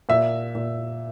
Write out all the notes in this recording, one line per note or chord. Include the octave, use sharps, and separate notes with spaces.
A#2 E5
A#2